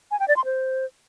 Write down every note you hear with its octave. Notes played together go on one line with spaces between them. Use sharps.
G#5
G5
D5
C6
C5